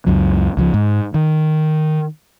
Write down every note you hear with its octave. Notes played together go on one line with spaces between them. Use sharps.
C#2 F#2 F#3
C#2 E3 F3
G#2
D#3